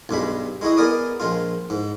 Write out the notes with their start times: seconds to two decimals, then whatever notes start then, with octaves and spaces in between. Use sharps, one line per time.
0.09 B1 G2 G#3 B5
0.61 G#3 E4 F#4 D#5
0.77 B3 G#4 A#4 D5 D#5
1.20 A#1 G#3 F4
1.70 G#2